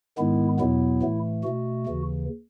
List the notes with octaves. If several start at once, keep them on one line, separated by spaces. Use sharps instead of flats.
G#2 D#3 G#3 B3 E4
E2 B2 F#3 B3 E4
A2 E3 A3
B2 A3 F#4
D#2 C#3 E3